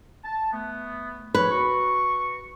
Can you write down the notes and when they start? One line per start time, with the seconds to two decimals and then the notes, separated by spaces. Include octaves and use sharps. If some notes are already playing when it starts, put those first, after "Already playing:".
0.24 A5
0.52 A3 B3
1.35 F3 B4 C#5
1.50 F#4 C#6